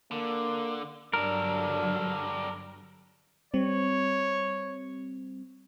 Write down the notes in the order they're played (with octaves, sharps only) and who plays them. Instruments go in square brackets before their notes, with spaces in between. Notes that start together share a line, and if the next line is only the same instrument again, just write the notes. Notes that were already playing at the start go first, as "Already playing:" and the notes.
[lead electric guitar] D3 [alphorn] A#3
[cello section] G2 D3 F#3 [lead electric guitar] G3 A4 [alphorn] D4 [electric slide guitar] A#4
[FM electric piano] G3 C4 [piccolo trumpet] C#5